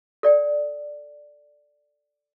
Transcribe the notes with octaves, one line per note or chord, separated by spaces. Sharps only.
A4 D5 G5